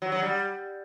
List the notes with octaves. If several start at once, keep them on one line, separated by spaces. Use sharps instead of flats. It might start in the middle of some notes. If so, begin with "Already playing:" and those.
F#3
F#3
G3